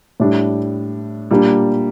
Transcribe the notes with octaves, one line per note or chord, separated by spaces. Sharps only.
A2 G3 D4
A#2 G3 A#3 D4